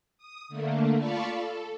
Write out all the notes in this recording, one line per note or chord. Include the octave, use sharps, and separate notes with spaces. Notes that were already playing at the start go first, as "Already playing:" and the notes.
D#6
D3 A3 A#3
F4 D5 F5 A5 B5 C#6
A4